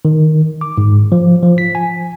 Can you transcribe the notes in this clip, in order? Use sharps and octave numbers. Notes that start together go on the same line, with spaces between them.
D#3
D6
G#2
F3
F3
B6
G#5